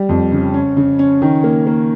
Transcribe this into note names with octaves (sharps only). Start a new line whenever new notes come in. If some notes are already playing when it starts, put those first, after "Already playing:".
Already playing: G3
F2
C#3
C#4
C#3
C#4
D#3
A#3
A#3